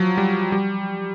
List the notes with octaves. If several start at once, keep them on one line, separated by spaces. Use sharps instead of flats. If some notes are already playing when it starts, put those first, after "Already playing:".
Already playing: F3 F#3
G3
G3